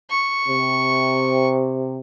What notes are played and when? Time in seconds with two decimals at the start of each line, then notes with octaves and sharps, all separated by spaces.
0.10 C#6
0.48 C3